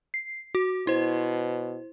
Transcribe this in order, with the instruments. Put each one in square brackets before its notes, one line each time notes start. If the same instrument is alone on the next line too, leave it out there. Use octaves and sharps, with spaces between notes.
[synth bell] C7
F#4
[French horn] B2 [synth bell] E4 C5